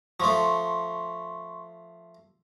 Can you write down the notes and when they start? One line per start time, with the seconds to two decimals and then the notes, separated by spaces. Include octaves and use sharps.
0.20 F3 A3 C6 C#6